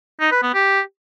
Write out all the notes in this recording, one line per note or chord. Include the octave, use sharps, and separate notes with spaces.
D#4
B4
B3
G4